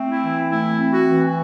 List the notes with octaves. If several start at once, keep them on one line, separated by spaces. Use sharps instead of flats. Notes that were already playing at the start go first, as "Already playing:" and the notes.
Already playing: A3 C4
E4
E3
A3 E4
C4
F#4
E3